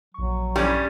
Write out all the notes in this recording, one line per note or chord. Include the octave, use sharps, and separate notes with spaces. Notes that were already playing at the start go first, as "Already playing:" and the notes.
A#1 F#3 C#6
G2 G3 C#4